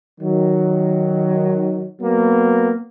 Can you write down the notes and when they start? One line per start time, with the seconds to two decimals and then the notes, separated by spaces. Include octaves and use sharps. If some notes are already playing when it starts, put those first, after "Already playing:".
0.20 D#3 F#3
2.00 F#3 A#3 B3